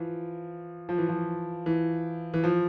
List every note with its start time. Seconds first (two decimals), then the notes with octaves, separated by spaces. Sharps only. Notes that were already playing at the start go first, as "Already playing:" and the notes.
Already playing: E3 F3
0.89 F3
0.98 E3
1.09 F3
1.66 E3
2.34 E3
2.44 F3